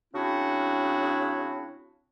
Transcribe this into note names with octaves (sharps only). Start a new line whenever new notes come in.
C#3 C4 D4 E4 F#4